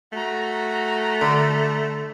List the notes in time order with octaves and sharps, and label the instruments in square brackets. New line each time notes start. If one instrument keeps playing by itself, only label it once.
[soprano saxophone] A3 [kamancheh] F#4 A#5
[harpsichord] D3